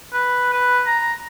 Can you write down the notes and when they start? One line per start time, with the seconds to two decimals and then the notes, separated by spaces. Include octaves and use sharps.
0.13 B4
0.53 B4
0.87 A#5